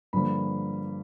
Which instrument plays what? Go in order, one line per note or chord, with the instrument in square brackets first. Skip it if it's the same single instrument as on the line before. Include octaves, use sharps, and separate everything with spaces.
[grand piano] G2 D3 F3 A#3 B5